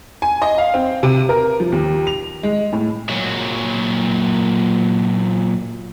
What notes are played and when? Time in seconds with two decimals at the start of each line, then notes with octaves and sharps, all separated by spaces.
0.22 G#5
0.42 D#5
0.58 F5
0.74 C4
1.03 C3
1.29 A#4
1.60 F3
1.72 D#2
2.07 F7
2.43 G#3
2.73 A2
3.09 A#2 F#3